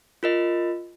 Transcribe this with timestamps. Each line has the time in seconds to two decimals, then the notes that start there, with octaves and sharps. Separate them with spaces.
0.23 F4 A#4 D#5